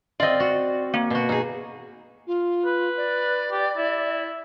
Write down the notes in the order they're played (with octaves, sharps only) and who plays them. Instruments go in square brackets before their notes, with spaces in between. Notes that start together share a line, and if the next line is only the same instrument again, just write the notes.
[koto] C4 F4 [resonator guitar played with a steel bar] D5 D#5
[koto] F#4
[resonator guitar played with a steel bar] A#3
[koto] B2 F#4
D#4 G#4
[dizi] F4
[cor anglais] B4
[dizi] D5
[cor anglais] G4
E4